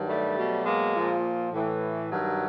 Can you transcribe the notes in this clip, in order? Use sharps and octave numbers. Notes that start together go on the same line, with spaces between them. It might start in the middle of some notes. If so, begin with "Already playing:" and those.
Already playing: G2 D#3 F#3
G3 A3
B2 F#3
G#3 A#3
A#2 F3
A2 E3
G2 D#3 F#3